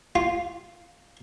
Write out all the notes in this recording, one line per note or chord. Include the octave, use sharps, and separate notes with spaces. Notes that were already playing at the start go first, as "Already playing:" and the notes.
F4